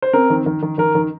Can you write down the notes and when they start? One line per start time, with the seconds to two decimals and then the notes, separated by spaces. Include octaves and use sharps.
0.02 C5
0.13 C4 A#4
0.30 D#3
0.46 D#3
0.62 D#3
0.78 D#3 A#4
0.95 D#3